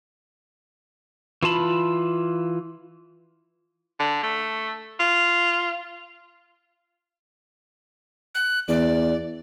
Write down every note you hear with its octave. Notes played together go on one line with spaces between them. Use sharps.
E3 F4 A5 B5
D3
A3
F4
F#6
E2 D5